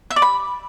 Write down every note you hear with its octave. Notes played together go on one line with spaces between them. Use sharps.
E5
D5
B5